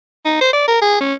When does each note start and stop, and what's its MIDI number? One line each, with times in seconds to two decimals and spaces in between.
0.25 0.36 63
0.41 0.48 72
0.53 0.65 74
0.68 0.81 70
0.81 0.96 68
1.00 1.13 61